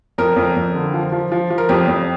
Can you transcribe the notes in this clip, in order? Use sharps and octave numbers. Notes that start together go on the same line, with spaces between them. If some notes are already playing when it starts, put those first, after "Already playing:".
F2 A#4
F2
F2
D3
F3
F3
F3
F3
A#4
F2 G4
F2